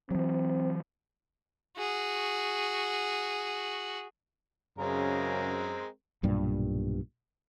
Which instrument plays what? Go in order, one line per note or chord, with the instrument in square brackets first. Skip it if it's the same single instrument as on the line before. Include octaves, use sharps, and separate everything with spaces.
[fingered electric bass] E3 F#3 [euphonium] C4
[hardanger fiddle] F#4 G#4
[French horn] F#2 [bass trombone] C#3 [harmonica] G#3 C4 A#4
[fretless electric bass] B1 G2 A#2 G3